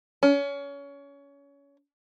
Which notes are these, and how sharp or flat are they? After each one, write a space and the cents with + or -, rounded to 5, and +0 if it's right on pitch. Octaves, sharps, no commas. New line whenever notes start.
C#4 +25